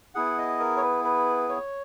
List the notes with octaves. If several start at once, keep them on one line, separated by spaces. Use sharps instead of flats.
B3 E4 G#4 F#5
D#5
A#4
C#5
B4
B4
C#5